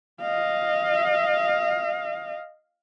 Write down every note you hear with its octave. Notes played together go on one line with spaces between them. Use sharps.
D#5 F5